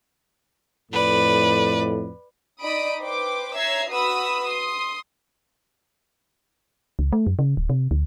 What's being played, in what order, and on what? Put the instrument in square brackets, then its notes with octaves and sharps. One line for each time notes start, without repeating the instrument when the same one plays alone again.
[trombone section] F2 A2 [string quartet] B4 D5
[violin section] D#4 D5 B5 D#6 D7
B4 C5 G5 D6
C#5 E5 A#5 E6 G#6 C7
F#4 B4 B5 D#6 E6
C6 D#6
[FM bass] C#2
A3
F#2
C#3
D1
C3
D2